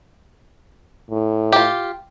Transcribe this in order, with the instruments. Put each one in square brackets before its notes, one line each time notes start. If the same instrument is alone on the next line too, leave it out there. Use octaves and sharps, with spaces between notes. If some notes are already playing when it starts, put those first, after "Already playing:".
[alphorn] A2
[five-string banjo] F4 G4